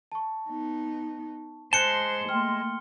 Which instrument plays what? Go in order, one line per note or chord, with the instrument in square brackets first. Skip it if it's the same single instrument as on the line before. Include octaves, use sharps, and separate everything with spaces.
[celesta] A5 C#6
[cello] B3 D#4
[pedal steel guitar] G#3 A5 [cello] C5 [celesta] F#6 G6 [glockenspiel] C#7 G7
[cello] A3 A#3 [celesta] G5 C6 F6